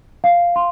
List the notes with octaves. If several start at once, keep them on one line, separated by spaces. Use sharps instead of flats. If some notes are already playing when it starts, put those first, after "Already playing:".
F5
C6